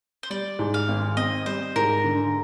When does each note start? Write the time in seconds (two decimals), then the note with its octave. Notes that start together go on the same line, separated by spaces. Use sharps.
0.23 C5
0.30 G3 D5
0.59 G#2
0.74 F5
0.88 G#1
1.17 C4 D#5
1.46 G3 C5
1.76 G#2 A#4
2.04 D3